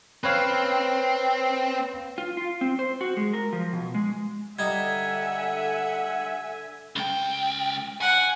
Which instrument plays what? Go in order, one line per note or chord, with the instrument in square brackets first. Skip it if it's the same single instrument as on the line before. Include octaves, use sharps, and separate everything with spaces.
[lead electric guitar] C4 [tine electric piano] B4 C#5 F5
[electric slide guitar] F4
F4
C4
C5
F#4
G#3
A#4
F3
B2
G#3
[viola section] D3 E5 G#5 [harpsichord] G3 D#4 [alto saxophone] F#5 [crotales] G#6
[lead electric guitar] C#2 G5
[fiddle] F#5 [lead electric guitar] G#5